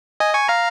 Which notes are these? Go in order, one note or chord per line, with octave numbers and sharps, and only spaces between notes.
D#5 G#5
G#5 C#6
F5 A#5